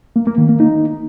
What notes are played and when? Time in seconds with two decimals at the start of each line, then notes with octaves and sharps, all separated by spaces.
0.16 A#3
0.27 A#3
0.38 D#3
0.49 A#3
0.60 D#4